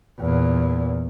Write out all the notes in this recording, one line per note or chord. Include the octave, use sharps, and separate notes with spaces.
E2 A#2